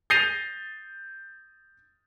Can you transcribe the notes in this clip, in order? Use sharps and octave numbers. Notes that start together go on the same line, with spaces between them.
G6 A6 A#6 C7 D#7 F7